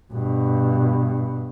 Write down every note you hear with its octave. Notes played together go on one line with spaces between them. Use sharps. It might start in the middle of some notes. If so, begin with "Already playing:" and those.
G2 B2